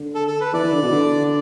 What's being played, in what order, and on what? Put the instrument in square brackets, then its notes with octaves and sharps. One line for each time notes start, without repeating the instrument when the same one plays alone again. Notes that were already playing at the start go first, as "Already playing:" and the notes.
Already playing: [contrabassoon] D3
[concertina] A4
A4
B4
[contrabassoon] E3 [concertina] D5
[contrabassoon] E3
D3
B2
D3